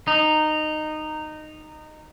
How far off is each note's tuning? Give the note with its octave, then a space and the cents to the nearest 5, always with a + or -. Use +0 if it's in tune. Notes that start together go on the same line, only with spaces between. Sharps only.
D#4 -15